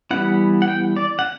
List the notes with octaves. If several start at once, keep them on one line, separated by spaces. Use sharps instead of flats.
E3 G3 B3 E4 F#5
F#5
G5
D5
F#5